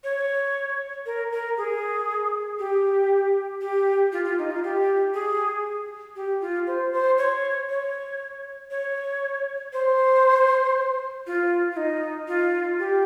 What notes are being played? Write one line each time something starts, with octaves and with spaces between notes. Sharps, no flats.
C#5
A#4
A#4
G#4
G4
G4
F4
F4
D#4
F4
G4
G#4
G4
F4
C5
C5
C#5
C#5
C#5
C5
F4
F4
D#4
F4
G4